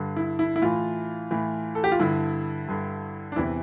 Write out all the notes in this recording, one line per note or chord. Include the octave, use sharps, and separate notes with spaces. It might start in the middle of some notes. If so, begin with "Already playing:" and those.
Already playing: G2 D3
E4
E4
E4
A2 E3 F4
A2 E3
A4
G4
F4
G2 D3 E4
G2 D3
D4
E2 C3 E3 E4